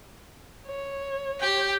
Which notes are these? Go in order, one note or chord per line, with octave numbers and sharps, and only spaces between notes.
C#5
G4 G5